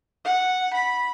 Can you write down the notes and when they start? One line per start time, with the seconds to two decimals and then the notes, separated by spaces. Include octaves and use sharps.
0.25 F#5
0.74 B5